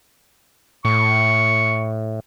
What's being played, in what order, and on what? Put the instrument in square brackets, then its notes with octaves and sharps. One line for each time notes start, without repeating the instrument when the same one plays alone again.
[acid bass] A2 [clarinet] C#6